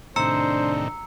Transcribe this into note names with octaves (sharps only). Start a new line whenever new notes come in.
A2 C3 D#3 D4 C5 A#5 E6 C#7